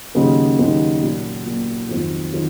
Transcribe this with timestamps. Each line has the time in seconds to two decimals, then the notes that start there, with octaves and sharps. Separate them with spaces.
0.15 D#2 C#3 F#3 A#3 D#4
0.59 D#2 C#3 F#3 A#3 D#4
1.02 A#2 F#3 A#3
1.45 A#2 F#3 A#3
1.89 F2 D#3 F#3 C4 F4
2.32 D#3 F#3 C4 F4